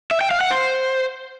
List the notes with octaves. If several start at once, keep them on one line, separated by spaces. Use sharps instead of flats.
E5
G5
F5
F#5
C5